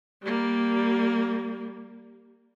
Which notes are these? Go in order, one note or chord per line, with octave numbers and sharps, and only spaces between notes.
G3 A#3